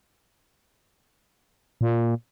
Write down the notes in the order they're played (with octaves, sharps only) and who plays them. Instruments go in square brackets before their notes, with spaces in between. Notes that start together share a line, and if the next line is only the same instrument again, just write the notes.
[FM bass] A#2